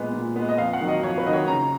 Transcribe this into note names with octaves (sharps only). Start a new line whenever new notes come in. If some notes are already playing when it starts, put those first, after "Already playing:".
Already playing: A#2 G#3 B3
A#2
G#3 B3
D#5
F2 F5
F#5
D#3 F#3
D#5
F2 C#5
B4
D#3 F#3 D#5
C#5
C#3 A#5